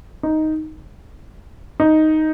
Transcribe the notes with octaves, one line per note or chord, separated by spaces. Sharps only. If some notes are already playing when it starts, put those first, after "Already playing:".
D#4
D#4